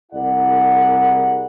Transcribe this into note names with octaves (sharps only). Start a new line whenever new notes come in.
C2 E4 G#4 A#4 D5 F#5